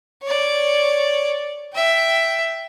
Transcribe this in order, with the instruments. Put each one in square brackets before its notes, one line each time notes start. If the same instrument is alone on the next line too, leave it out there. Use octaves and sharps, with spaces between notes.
[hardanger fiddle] C#5 D5
E5 G5